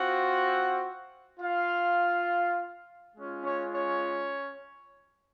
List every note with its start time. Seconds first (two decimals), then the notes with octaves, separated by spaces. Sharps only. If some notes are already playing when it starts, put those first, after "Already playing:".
Already playing: C4 F4 F#4 F#5
1.40 F4 F5
3.14 G#3 C#4 F4
3.44 C#4 C#5
3.73 C#4 C#5